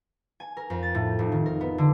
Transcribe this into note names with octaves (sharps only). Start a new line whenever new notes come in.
G#5
A#4
F2
A6
A2
F1
D#3
A#4
B3
D3